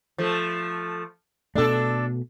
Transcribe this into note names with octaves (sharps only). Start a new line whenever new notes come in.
F3 A3
B2 A3 D4 A4